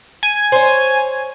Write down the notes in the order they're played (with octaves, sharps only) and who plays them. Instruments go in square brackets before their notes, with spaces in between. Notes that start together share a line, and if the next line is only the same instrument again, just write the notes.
[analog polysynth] G#5
[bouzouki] C5 C#5